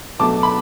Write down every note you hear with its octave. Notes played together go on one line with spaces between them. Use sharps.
B2 F#3 A3 A5 D6
B5